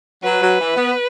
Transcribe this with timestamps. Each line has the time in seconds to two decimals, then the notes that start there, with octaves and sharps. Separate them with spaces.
0.23 F#3 B4
0.41 F#3
0.59 E3
0.76 B3